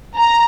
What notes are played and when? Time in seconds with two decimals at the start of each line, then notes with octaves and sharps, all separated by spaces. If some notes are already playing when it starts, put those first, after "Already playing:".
0.17 A#5